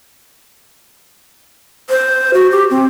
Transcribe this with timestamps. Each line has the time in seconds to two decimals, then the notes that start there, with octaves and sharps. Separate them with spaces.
1.90 C5
2.34 F#4
2.52 G4
2.71 C4